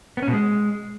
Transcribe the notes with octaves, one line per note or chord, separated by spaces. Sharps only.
B3
C#4
B2
G#3